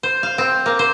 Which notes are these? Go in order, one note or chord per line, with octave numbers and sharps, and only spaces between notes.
C5
F5
C4
A#3
C5